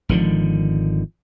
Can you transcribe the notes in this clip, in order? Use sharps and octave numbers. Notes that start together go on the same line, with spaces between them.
G#1 D3 D#3 F3